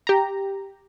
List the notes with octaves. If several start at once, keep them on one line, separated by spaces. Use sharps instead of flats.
G4 A#5